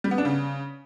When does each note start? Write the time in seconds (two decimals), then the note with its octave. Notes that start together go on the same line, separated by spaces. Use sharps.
0.04 G3
0.11 B3
0.18 D4
0.25 C#3